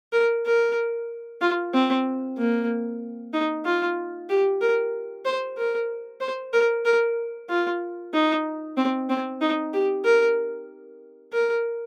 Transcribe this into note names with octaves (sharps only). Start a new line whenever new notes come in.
A#4
A#4
F4
C4
A#3
D#4
F4
G4
A#4
C5
A#4
C5
A#4
A#4
F4
D#4
C4
C4
D#4
G4
A#4
A#4